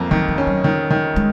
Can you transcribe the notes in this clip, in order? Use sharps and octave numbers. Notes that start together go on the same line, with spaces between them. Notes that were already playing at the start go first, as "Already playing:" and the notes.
Already playing: F2 A#3
D#3 F#3
F3
C#4
F#3
D#3
D#3
G#3